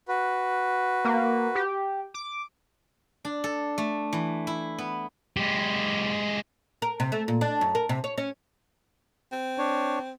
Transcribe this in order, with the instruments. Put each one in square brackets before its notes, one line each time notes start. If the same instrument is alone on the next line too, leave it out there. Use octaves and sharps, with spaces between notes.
[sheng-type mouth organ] F#4 B4
[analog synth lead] A#3
G4
D6
[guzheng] D4
A4
A3
E3
E4
B3
[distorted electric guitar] G#3 G4
[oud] A#4
C3
A3
A#2
D4
F#2
A#4
C3
C#5
C#4
[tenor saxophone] C4
[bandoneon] D4 C#5